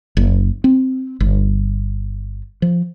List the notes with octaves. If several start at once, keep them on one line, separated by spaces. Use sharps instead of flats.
F#1
C4
G1
F3